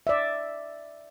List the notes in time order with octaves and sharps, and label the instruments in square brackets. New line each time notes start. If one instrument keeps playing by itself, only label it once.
[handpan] D5 E5